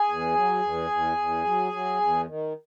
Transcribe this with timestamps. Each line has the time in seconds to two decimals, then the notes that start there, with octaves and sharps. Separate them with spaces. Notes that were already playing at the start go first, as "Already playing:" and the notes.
Already playing: G#4 G#5
0.09 E2
0.35 F#3
0.62 E2
0.90 E2
1.17 E2
1.44 F#3
1.73 F#3
2.00 E2
2.27 D#3